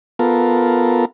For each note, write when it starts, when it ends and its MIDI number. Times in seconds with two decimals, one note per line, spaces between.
0.19 1.05 59
0.19 1.05 65
0.19 1.05 69
0.19 1.05 70